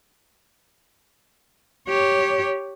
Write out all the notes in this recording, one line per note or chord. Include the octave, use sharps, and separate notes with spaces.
G4 C#5